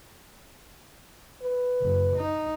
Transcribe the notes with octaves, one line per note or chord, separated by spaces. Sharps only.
B4
F#1
D#4